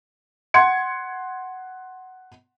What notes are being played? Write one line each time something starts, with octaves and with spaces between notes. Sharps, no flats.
F#5 C6 G#6 C#7